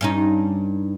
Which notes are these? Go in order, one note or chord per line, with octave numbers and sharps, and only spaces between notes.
G2 C#4 D#4